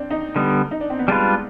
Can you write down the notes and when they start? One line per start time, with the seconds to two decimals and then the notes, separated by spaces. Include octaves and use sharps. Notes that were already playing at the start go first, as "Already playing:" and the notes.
Already playing: C4 D4
0.11 D#4
0.36 D3 G3 B3
0.71 D#4
0.81 D4
0.90 C4
0.99 B3
1.08 G3 G#3 D4 F4 B4